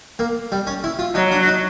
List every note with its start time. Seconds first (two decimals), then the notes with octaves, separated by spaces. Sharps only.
0.19 A#3
0.52 G3
0.67 C#4
0.84 E4
0.99 F4
1.15 F#3 D#4
1.31 D4
1.48 D#4